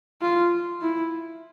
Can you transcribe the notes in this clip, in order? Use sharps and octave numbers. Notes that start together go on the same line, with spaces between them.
F4
E4